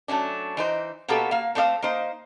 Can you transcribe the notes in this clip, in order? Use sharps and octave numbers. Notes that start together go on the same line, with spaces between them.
F#3 A3 C#4 D4
E3 D#4 C5
B2 A#3 B3 F#4 G4 A4
A#3 F5
A3 C4 C5 D5 F5
A#3 D#4 C5